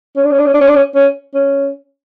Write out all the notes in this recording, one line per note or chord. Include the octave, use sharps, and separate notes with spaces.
C#4
D4
C#4
D4
C#4
D4
C#4
D4
C#4
C#4
C#4